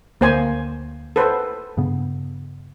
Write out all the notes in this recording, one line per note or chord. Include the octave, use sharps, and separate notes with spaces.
D2 A#3 C5 G#5
A4 B4 C5
G2 C#3 B3